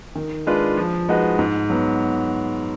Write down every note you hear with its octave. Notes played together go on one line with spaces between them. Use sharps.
D#3
G#3 D4 F4 B4
F3
G#3 D#4 F#4 B4
G#2
F#3 B3